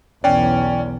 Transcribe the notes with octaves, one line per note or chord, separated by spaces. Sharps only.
B1 E2 C#4 C#5 D5 G5